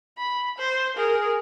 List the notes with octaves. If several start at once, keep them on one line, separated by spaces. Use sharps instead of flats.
B5
C5
G#4 A#4